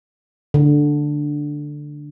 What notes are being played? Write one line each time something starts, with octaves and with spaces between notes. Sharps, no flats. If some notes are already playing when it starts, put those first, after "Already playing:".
D3